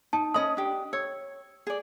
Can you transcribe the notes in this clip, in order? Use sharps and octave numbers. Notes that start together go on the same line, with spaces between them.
D#4 A5
C#4 D#5 B5 D#6
D4 G4
C#5 E6
G#4 D5